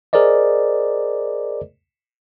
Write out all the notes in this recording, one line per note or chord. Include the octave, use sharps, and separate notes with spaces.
G#4 A#4 C5 D5 D#5